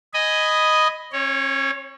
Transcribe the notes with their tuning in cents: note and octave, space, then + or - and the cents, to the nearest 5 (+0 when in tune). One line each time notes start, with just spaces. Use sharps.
D#5 +0 G#5 +0 B5 +0
C#4 -40 C#5 +0